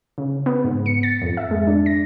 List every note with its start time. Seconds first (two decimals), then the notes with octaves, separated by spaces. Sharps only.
0.18 C#3
0.46 B3
0.64 G#2
0.86 C#7
1.03 A6
1.22 F2
1.37 E5
1.51 G#3
1.67 D4
1.86 A#6